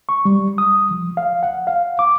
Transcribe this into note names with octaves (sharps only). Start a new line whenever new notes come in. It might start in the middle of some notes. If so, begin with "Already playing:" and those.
C#6
G3
D#6
F3
F5
F#5
F5
D6